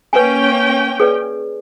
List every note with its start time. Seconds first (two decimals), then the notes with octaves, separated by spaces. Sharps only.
0.13 A#3 C#4 B4 G5 G#5
1.00 G#4 B4 D5